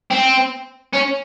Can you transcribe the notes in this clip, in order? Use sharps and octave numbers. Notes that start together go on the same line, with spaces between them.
C4
C#4